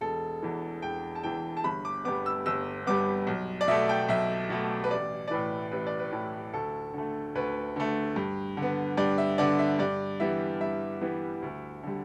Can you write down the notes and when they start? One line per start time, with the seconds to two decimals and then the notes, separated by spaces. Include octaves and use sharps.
0.01 E1 A4
0.42 E2 E3
0.82 E1 G5
1.15 A5
1.23 E2 E3 G5
1.57 A5
1.64 G1 B5
1.85 D6
2.05 G2 G3 B3 D6
2.26 E6
2.46 G1 E6
2.87 G2 G3 B3 D6
3.27 B1
3.61 D5
3.68 B2 A3 E5
3.89 G5
4.09 B1 E5
4.50 B2 A3
4.84 B4
4.91 A1 D5
5.28 D5
5.31 A2 E3 B4
5.72 A1 B4
5.87 D5
5.99 B4
6.12 A2 E3
6.53 D2 A4
6.94 D3 A3
7.35 D2 B4
7.76 D3 A3
8.16 G2
8.57 D3
8.62 B3
8.97 G2 D5
9.18 E5
9.38 D3 B3 D5
9.59 E5
9.79 G2 D5
10.20 E3 G3 B3 E5
10.61 G2 E5
11.01 E3 G3 B3
11.42 D2
11.83 D3 G3